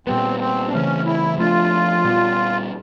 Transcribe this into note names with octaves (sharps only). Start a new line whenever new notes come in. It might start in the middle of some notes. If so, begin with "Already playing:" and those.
A#2 G3 B3 C4
C4
D4
C#3 E3 A3 C4 C#4
E4
F3 A3 D4 F4
A#2 G3 B3